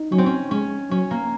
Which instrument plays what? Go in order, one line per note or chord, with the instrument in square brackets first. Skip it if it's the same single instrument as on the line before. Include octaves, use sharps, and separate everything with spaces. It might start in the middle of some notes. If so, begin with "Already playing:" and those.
Already playing: [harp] D#4
[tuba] F#3 [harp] C#4
[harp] C4
C#4
[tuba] G#3 [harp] C#4
[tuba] F#3 [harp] C#4
[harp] A#3